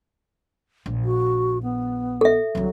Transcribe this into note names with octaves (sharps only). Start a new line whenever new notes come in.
A#1
F#4
B3
A4 E5
C2 D3 F#3